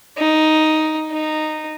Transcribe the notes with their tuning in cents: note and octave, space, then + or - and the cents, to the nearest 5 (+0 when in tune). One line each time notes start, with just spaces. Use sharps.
D#4 +5
D#4 -10